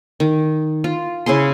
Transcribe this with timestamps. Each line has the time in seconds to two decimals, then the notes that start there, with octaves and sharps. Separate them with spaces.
0.20 D#3
0.84 F4
1.26 C#3 E4 G#4 C6